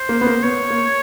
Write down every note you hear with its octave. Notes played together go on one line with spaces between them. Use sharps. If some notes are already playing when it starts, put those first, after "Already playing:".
Already playing: C5
A#3
B3
A#3
B3 C#5
A#3